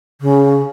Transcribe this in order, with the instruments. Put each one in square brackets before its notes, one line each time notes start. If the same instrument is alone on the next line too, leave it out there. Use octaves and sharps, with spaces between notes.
[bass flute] C#3